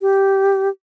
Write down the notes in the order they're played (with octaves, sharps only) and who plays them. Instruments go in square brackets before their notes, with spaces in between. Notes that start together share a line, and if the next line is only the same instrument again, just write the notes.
[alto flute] G4